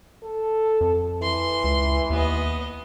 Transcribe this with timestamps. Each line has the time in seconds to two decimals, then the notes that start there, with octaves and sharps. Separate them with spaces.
0.23 A4
0.81 F2
1.23 E3 C6
1.64 C#2
2.10 D#2 B3 D#5